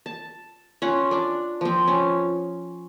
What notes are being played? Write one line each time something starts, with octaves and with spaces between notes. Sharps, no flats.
A5
C#4 F4 F#5
D4 D5
F3 C4
C#4